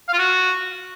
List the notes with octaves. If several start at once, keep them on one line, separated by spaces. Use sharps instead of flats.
F5
F4
F#4